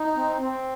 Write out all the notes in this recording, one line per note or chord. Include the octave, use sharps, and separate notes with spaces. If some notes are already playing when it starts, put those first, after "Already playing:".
Already playing: D#4
C4
C4